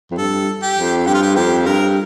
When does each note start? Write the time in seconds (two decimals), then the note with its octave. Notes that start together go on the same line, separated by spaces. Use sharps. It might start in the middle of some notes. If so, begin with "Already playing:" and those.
0.11 F2
0.17 G2 A4
0.62 G4
0.77 F2
1.06 G2 G4
1.14 F4
1.22 G4
1.36 F2 G4
1.66 G2 A#4